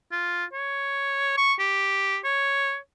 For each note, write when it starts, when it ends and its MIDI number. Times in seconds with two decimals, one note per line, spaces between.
0.11 0.45 65
0.53 1.33 73
1.37 1.54 85
1.59 2.18 67
2.24 2.77 73